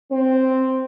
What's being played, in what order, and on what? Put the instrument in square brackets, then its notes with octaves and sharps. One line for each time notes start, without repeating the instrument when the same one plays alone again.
[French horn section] C4